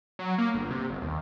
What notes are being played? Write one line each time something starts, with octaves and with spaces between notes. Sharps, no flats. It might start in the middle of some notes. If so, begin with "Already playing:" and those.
F#3
A#3
G1
C3
G1
D#2